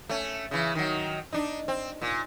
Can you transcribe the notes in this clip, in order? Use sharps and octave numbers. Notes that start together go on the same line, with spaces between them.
A3 C#4
C#3 E3
D#3 F#3
D4 D#4
C4
A#2